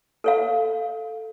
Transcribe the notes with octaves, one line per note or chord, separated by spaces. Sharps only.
A4 C#5 F5